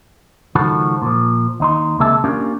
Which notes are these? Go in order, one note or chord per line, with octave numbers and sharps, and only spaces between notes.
C#2 D#3 F3 F#4 A4 B5
A#2 F3
D#2 D#4 C6
C#2 C3 A#3 G#4 E5 A5
A#3 C#4 D4 F4 G4 A#4